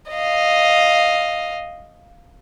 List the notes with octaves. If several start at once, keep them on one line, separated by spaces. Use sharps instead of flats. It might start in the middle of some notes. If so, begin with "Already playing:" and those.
D#5 F5